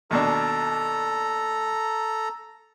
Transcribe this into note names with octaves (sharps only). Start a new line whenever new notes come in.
D#2 B2 D4 A4 A#5